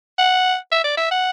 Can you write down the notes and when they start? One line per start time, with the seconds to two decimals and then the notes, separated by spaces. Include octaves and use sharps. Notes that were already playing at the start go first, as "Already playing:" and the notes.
0.18 F#5
0.72 E5
0.84 D5
0.97 E5
1.11 F#5